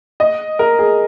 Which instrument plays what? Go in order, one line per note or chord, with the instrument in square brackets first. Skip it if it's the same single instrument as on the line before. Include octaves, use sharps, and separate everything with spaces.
[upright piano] D#5
A#4
G#4